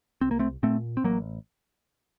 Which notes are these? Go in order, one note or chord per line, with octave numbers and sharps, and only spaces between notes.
C2 C4
A#3
A3 C4
A#2 A3 C4
C4
A1 F#3 A#3